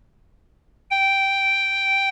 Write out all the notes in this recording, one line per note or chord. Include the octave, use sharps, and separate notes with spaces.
G5